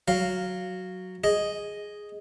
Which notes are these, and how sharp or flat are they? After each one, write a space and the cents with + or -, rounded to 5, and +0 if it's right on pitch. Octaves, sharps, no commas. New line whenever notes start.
F#3 +0 F5 +0
G#4 +0 D#5 +0